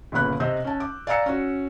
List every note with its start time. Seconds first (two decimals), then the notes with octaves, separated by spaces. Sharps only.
0.12 G1 A#2 C#3 B3 B5 F#6
0.40 C3 D#5 E6 G6
0.64 C#4 A5
0.80 D6
1.07 D5 F5 G#5 A#5 E6 C#7
1.26 C#4 F#4